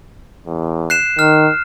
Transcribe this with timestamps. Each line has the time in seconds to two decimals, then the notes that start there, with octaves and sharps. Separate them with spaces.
0.47 E2
0.90 F#6 C7 E7
1.19 D#3 F6